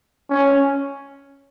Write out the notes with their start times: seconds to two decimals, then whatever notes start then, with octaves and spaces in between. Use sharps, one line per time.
0.30 C#4